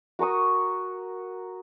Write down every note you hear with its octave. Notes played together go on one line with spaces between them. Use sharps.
F#4 A#4 C#6 D#6